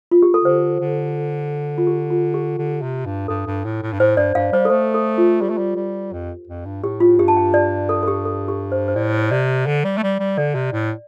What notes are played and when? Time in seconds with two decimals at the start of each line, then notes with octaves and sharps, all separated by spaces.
0.11 F4
0.22 G4
0.34 A4
0.45 D3 C5
0.81 D3
1.78 F4
1.87 G4
2.10 F4
2.34 G4
2.58 D3
2.82 C3
3.06 G2
3.28 G2 A4
3.47 G2
3.65 A2
3.83 A2
3.93 G2
4.00 A2 C5
4.17 G2 D5
4.35 G2 F5
4.52 G3 C5
4.65 A4
4.70 A3 C5
4.94 A4
5.18 F4
5.41 G3 G4
5.50 A3
5.58 G3
5.76 G3
6.13 F2
6.48 F2
6.65 G2
6.83 A2 G4
7.00 F4
7.18 G2 G4
7.28 A5
7.37 G5
7.54 D5
7.89 A4
8.03 A4
8.08 G4
8.25 A4
8.48 G4
8.72 C5
8.88 C5
8.96 A2 D5
9.31 C3 D5
9.67 D3
9.85 G3
9.98 A3
10.03 G3
10.20 G3
10.38 D3 D5
10.55 C3
10.73 A2